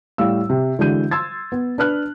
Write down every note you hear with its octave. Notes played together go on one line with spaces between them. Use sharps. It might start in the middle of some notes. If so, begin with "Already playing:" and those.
A2 G3 F5 E6
C3
D3 E3 G#3 F#4 G6 D#7
C6 E6 G#6 A6
B3
D4 B4 F6 F#6